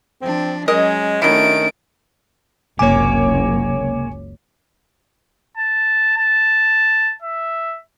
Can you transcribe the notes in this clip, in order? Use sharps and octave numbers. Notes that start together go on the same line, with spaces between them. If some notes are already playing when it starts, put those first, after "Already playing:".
F3 C4 D4
F#3 G#3 C#4 A#4 D#5
D#3 F#3 A3 C#4 D4 E4 D7
F#1 C#2 C3 A#3 C#5 G#5 D6
A5
A5
E5